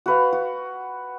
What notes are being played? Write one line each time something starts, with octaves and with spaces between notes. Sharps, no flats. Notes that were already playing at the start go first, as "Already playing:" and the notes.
F#4 B4 F5
F#4